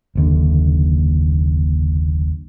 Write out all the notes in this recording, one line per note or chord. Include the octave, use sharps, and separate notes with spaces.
F#1 D#2 D3